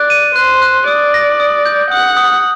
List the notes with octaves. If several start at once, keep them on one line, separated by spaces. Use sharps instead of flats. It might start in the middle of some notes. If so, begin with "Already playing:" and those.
Already playing: D5 F#6
D#7
C5 F#6
F#6
D5 D#6
A#6
D#6
G6
F#5 D#6
D#6